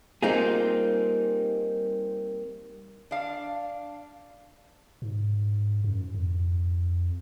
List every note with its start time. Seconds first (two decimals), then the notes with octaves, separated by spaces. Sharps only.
0.23 G3 A#3 C4 D#4 F4 G#4
3.11 D4 F5
5.02 G#2
5.84 F#2
6.14 F2